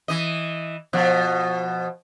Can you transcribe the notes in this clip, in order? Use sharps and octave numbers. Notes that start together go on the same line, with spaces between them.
E3 D#5
B2 F3